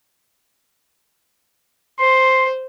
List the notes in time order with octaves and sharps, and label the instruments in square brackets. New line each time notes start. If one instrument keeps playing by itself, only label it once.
[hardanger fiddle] C5 [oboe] C6